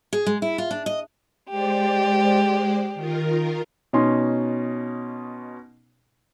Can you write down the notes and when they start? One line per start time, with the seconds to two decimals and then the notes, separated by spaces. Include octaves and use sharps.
0.13 G#4
0.26 G#3
0.42 E4
0.58 F4
0.71 D4
0.86 D#5
1.50 G#3 G4 C5 D5
2.95 D#3 F4 A#4
3.93 B2 C#4 D#4 C6